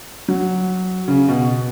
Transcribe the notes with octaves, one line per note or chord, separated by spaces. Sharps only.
F#3
C#3
B2